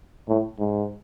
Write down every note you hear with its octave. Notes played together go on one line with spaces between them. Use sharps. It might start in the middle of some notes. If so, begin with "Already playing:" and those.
A2
G#2